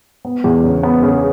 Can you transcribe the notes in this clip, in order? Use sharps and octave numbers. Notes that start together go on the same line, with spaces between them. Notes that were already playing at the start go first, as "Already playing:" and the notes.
B3
E2
C#3
B3
C#3